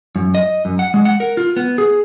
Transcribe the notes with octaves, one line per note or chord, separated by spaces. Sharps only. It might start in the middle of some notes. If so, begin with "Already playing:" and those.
F#2
D#5
F#2
F#5
G#3
F#5
A#4
F4
B3
G#4